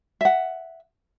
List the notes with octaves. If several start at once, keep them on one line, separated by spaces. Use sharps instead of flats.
E5 F#5